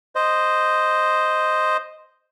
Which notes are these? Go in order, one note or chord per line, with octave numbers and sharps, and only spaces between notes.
C5 D#5